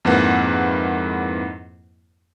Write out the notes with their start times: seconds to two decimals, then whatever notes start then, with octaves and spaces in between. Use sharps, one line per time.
0.05 F2 G#2 A#3 E4 B4 F#5